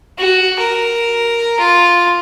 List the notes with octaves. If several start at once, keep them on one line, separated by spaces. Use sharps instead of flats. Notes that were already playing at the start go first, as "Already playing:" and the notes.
F#4
A#4
F4